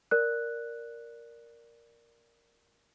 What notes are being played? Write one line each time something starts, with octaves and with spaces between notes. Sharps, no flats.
A#4 D5 F#6